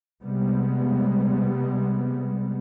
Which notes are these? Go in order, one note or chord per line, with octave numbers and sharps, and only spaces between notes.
C3 G3 G#3 B3